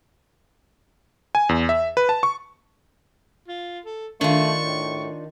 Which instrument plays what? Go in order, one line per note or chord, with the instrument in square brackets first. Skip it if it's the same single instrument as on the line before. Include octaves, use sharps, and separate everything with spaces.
[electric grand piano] G#5
E2
E5
B4
A5
C#6
[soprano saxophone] F4
A4
[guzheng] D#3 [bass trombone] A3 [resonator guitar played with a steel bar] D4 F4 [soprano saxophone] C#6
[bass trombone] A2